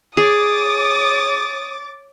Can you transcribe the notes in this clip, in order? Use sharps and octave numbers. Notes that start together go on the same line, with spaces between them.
G#4 C#5 D6 D#6 A6